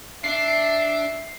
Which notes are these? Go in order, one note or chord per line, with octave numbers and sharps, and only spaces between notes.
D4 E5 C7